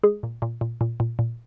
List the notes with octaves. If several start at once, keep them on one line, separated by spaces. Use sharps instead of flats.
G#3 G#4
A#2
A#2
A#2
A#2
A#2
A#2